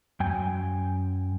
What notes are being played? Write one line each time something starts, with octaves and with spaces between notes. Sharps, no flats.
F#2 G5 G#5